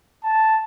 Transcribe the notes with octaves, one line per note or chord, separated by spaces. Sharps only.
A5